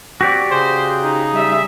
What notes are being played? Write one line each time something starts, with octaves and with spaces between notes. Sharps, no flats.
C4 F#4 G4 D5
C#3 G#4 C5
D#4
G3 E5